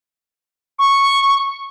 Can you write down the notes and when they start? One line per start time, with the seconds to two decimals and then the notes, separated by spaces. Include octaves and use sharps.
0.79 C#6